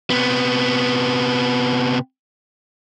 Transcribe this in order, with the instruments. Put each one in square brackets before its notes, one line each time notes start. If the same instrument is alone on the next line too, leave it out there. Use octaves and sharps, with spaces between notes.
[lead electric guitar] C3 B3